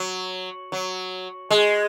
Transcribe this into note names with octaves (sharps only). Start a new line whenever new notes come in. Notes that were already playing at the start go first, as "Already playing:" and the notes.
Already playing: F#3
F#3
G#3